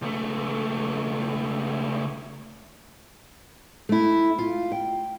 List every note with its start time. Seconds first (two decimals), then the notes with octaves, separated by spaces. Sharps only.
0.02 C#2 A3
3.89 A3 E4
4.38 F4
4.72 G5